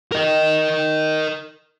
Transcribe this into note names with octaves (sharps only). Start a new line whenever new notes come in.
A#4 D#5